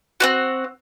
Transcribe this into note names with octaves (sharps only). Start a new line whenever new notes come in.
C4 C#4 F#4